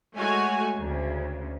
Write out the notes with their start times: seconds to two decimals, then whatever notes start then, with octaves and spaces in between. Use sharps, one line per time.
0.16 G#3 A3 F#4 C#5 G#5
0.79 D2 C#3